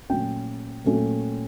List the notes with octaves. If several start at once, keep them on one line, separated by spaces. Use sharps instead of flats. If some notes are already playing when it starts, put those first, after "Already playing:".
A#2 F#3 A3 C#4 G5
A#2 F#3 A3 C#4